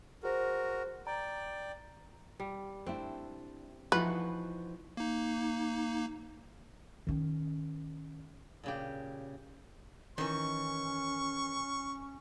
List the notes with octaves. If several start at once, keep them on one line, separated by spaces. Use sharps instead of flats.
F#4 G#4 A#4 C5
D5 G5 A#5
G3
A3 C4 D4 E4
E3 F3 D#4 F4 F#4 B4
A#3 D#4
D#3 C#4
A#2 C#3 G4
D#3 E3 C#4 C#6